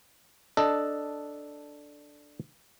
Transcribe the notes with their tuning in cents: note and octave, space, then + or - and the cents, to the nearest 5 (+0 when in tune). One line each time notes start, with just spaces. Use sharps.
D4 +0 A4 +0 D#5 +0